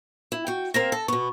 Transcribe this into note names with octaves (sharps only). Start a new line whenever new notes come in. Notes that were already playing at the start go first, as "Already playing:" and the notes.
E4
F#4 G5
A#3 C4 A#4 A#6 E7
A4
B2 B3 C#6